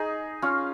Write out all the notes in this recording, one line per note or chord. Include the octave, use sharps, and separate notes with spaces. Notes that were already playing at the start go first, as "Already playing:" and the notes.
Already playing: D#4 G#4
C#4 F4